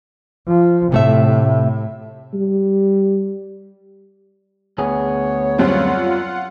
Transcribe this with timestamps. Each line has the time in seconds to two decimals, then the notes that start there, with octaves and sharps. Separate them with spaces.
0.47 F3
0.92 A2 C3 A3 E5
2.34 G3
4.78 D2 B3 G#4 C#5
5.58 F#2 G3 C4 F4 F#5